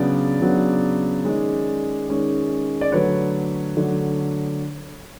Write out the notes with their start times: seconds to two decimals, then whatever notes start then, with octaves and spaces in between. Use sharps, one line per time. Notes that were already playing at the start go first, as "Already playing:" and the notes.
Already playing: C#3 F#3 B3 D4 D5
0.41 C#3 F#3 B3 D4
1.25 D#3 G#3 C#4
2.09 D#3 G#3 C#4
2.81 D5
2.92 D3 F#3 A3 B4 C#5
3.76 D3 F#3 A3